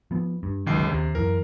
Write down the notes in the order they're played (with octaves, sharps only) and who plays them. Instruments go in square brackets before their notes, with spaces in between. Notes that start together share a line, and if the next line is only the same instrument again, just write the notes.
[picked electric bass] F3 B3
G2
[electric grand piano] G1 C#2 C7 [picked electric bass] C3 D#3 F#3
[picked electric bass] D#2 [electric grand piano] C3
[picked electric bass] F#2 E3 [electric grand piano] A#4